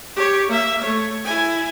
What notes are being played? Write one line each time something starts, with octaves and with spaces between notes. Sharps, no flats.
G4 C#5
A#3 E5
A3 C#5
E4 G#5